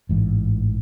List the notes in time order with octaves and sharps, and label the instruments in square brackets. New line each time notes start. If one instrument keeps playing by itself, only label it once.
[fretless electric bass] A1 G#2 E3